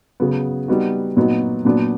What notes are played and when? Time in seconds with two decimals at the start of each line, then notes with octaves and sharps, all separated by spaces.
0.20 C#3 F#3 B3
0.68 G3 B3 D#4 F#4
1.17 A#2 F#3 B3 D#4 F#4
1.65 A#2 F#3 B3 D4